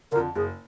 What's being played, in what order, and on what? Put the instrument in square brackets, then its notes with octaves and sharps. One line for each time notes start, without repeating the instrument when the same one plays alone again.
[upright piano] D3 [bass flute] A#4
[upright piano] F2
[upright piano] F#1 [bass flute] G#4